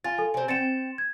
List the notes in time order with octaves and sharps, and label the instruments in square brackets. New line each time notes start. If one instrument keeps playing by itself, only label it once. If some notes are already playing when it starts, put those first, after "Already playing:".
[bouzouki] F4 [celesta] G#5 A6
[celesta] A4 G#5
[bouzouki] C3 C4 [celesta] G#5
[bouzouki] C4 G5 [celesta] A6 C#7 E7
[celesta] G#6